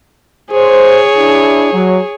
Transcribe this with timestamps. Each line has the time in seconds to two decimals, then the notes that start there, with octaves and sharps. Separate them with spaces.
0.52 G#4 C5 C#5
1.15 D4 E4
1.72 F#3